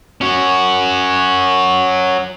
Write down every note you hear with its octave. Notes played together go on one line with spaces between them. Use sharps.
C#4 F#4